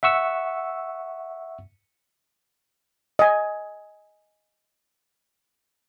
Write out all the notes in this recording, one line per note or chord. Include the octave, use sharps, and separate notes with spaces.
E5 F#5 C#6 E6
D#5 G#5